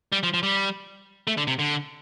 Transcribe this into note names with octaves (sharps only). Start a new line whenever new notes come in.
G3
F3
F3
G3
A3
D3
C3
D3